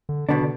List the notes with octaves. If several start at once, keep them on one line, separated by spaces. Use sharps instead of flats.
D3
B2 D3 B3 D4
D3